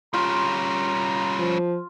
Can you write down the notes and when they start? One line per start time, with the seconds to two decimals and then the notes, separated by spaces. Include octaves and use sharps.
0.14 G3 C#4 F4 A#5
1.39 F3